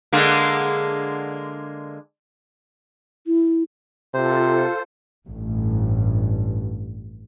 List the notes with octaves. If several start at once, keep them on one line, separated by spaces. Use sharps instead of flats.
D3 G#3 A#3
E4
C3 F4 A4 C5
A1 G2